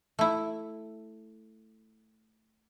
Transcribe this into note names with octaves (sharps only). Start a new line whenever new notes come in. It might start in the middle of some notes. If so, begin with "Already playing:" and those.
A3 E4